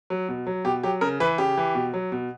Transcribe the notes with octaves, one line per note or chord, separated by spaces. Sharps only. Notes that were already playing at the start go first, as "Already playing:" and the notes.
F#3
B2
F#3
B2 G4
F#3 G4
C#3 A#4
E3 B4
C#3 G4
E3
B2
F#3
B2